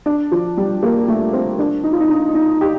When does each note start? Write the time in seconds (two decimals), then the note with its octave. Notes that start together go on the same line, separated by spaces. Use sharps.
0.06 D4
0.31 F3
0.57 G3
0.83 A#3
1.08 A3
1.33 C4
1.59 D4
1.84 D#4
1.92 F4
2.00 D#4
2.09 D4
2.35 D#4
2.61 G4